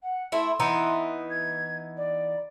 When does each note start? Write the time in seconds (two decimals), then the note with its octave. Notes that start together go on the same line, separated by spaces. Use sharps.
0.02 F#5
0.32 A3 E4 C6
0.60 E3 B3 D#4
1.29 G#6
1.96 D5